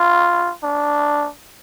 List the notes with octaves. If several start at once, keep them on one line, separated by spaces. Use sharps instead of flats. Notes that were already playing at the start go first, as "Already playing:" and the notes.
Already playing: F4
D4